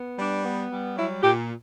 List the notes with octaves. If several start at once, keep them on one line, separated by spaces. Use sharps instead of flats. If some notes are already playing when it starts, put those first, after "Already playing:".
Already playing: B3
G3 D4
B3
G3
F#3 E4
A#2 G4